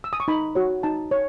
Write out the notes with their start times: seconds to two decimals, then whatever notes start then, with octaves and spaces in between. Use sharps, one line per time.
0.04 E6
0.13 D#6
0.20 C#6
0.28 D#4 B5
0.55 F#4 C#5
0.83 D#4 A5
1.11 C#5